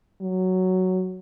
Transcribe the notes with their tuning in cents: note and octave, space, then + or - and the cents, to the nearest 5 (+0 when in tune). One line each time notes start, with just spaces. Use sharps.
F#3 +5